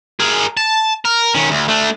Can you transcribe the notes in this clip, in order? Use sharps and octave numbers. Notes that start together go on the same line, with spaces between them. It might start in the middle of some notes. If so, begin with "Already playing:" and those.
G#4 A#4
A5
A#4
D#3 C#4
D2
A3 D4